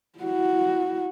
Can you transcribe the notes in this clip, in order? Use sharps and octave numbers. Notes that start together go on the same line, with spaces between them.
E4 F#4